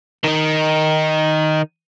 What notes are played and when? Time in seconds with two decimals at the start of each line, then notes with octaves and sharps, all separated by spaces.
0.24 D#3 D#4